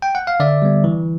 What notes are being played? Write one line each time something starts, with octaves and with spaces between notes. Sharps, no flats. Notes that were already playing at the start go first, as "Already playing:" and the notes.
G5
F#5
F5
D3 D5 E5
G3 B3
E3